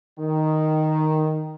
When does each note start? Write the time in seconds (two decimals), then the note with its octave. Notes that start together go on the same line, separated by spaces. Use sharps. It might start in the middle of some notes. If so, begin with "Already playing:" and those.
0.19 D#3